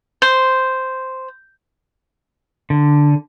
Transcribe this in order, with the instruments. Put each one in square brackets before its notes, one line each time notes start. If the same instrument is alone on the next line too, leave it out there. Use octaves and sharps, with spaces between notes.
[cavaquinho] C5
[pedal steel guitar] D3